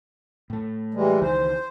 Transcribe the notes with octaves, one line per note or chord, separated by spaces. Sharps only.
A2 A3
E3 G3 G#3
C#2 D#3 E3 C5